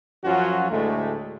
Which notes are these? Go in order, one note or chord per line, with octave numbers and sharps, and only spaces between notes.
F#2 F3 F#3 C#4 F4 F#4
D2 A2 G#3 A3